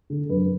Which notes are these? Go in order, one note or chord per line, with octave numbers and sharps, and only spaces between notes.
D3
F#2 B4